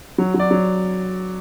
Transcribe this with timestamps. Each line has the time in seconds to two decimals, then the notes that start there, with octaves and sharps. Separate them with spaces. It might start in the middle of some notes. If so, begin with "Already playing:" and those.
0.18 F#3
0.34 F#3
0.40 D5
0.51 F#3